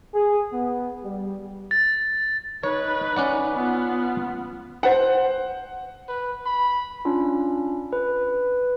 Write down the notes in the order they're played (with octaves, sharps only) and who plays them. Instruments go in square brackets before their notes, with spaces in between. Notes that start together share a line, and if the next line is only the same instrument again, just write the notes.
[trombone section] G#4
B3
G3
[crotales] A6
[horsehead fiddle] D#4 B4 [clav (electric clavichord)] C#5
[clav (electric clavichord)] C#4 D5 F#5
[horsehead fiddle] B3 F4
[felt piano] C5 F#5
[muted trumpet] B4
B5
[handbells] C#4 D4 F4
B4